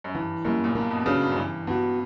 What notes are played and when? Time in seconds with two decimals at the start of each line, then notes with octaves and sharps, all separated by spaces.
0.04 F#2
0.15 G2 E3
0.45 F#2 G3 A#3
0.64 A#2
0.75 G2 A#3
0.91 B2
1.06 C#3 D4 F#4 B4
1.22 G2
1.32 F#2
1.36 G2 E3
1.67 G2 B3 F#4